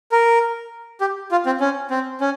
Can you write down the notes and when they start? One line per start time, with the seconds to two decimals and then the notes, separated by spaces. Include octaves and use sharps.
0.12 A#4
1.01 G4
1.31 F4
1.46 C4
1.60 C#4
1.90 C4
2.21 C#4